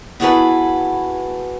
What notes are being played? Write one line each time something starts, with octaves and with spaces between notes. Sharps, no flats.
B3 E4 F#4 G#4 A4 B4